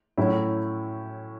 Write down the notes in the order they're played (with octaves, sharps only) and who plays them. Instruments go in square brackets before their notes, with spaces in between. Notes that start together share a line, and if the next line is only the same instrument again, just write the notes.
[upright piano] A2 F#3 C#4 E4